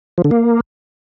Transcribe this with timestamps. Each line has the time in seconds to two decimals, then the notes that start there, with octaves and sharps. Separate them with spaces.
0.18 F3
0.24 D3
0.31 A#3